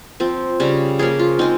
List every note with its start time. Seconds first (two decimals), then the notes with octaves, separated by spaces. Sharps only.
0.20 F3 C4
0.60 C#3 G3 C#4
0.99 F3 A#3 C#4 G#4
1.19 F4
1.39 G#3 C4 D#4